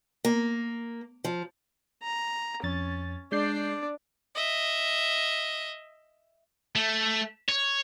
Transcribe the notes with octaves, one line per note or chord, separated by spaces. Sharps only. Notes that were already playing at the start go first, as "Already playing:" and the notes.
A#3
F3
A#5
F2 C#4 A6
G#3 D4 D5 G6 C7
D#5 E5
A3
C#5